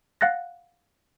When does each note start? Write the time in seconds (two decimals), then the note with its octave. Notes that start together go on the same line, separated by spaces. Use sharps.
0.21 F5 F#5 F#6 A6 A#6